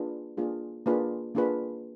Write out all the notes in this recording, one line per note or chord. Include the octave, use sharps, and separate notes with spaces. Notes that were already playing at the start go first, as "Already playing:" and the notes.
Already playing: A#3 D4 F4 G#4 B4
A#3 D4 F4 G#4 B4
A#3 D4 F4 G#4 B4
A#3 D4 F4 G#4 B4